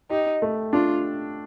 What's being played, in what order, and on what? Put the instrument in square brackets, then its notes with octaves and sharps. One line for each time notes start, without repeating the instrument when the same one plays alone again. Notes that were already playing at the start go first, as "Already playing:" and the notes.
[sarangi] D#4 [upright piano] G4
[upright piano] A3
[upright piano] D4 [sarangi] F4